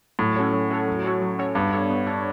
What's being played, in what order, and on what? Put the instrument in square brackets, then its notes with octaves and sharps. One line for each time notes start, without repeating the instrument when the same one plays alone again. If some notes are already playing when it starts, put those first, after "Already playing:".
[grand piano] A2 [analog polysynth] F#3
[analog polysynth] C#4 F#4 A4 C#5
F#3
C#4 F#4 A4 C#5
F#3
C#4 F#4 A4 C#5
F#3
C#4 F#4 A4 C#5
[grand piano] G2 [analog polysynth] B3
[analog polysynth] D4 A4 C#5
B3
D4 A4 C#5